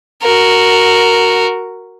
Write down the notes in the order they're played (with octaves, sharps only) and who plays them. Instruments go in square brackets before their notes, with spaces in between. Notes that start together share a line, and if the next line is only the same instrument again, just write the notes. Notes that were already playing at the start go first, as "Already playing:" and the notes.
[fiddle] F#4 A#4